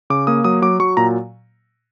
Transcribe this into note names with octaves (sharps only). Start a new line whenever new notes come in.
C#3 D6
A#3 D#6
F#3 D#6
F#3 D6
F#3 C#6
A#2 A#5